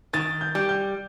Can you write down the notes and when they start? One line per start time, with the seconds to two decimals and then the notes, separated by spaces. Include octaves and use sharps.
0.13 D#3 A6
0.41 G6
0.55 G3
0.69 G6